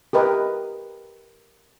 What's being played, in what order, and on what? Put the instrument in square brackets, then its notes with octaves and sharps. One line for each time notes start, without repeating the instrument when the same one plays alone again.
[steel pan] G4 A#4 B4 D#5